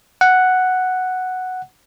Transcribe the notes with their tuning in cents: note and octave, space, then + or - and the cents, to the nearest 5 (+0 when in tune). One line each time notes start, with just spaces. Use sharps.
F#5 +0